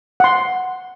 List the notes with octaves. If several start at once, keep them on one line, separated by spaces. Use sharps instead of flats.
F#5 C6